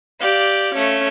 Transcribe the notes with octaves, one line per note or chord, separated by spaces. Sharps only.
G4 D5 F5
A3 C#4